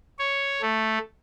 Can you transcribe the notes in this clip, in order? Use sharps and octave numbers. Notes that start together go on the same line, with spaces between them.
C#5
A3